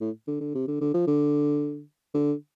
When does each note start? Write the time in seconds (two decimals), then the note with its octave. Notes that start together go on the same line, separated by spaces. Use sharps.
0.01 A2
0.27 D3
0.41 D3
0.55 C3
0.67 D3
0.81 D3
0.94 F3
1.07 D3
2.14 D3